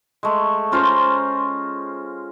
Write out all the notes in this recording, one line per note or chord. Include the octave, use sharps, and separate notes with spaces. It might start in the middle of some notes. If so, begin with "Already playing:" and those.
G#3 A3
C#4 F4 C5 A#5